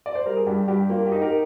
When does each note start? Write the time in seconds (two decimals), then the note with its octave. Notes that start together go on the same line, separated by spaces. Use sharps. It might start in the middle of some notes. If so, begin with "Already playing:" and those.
0.06 D5
0.15 C5
0.26 G3 A#4
0.37 G#4
0.47 G2 G4
0.68 G2 G4
0.89 A#3 F4
1.07 G4
1.12 D#4
1.22 G4 A#4